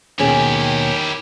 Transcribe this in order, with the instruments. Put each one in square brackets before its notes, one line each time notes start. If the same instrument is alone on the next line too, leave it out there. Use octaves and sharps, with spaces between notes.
[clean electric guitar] D#2 B2 [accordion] D#3 [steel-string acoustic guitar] C#4 G#4 [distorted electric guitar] E4 G4